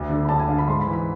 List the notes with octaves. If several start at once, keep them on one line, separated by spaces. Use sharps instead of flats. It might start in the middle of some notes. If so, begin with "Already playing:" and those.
Already playing: D2
D3
B5
D2 A5
G#5
D3 F5
B5
G#2 C6
B5
E3
B5